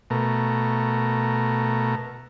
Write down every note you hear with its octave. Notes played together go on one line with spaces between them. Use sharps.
B2 A3 A#4